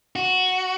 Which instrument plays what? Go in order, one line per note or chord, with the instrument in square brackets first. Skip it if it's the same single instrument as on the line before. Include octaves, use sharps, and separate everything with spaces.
[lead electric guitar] F#4